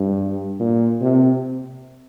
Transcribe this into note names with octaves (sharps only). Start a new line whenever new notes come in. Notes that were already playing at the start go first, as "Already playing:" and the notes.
Already playing: G2
A#2
C3